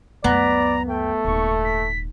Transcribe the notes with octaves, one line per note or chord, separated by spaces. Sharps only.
C#2 F#2 B3 D5 A#5
A3 G5
D#1 G#2 C#6
B6